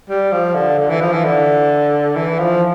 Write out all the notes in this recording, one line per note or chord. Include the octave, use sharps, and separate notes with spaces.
G3
F3
D3
D3
E3
F3
E3
D3
E3
F3